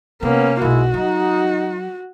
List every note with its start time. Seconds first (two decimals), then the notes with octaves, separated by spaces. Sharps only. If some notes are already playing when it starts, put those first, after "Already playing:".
0.22 C3 A#3 B3 C#4
0.62 B1 B2 G#3 E4 F#4
0.94 F#3 D#4